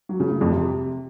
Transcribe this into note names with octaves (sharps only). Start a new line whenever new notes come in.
F#3
C#3
A2
F2
C3